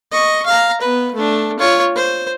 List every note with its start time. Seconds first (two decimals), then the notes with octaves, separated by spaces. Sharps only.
0.12 D#5 C#6
0.46 F5 A#5
0.81 B3 B4
1.14 A3 D4
1.59 F4 C#5
1.95 C5